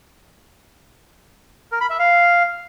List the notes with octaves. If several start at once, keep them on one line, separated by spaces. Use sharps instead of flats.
A#4
B5
E5
F5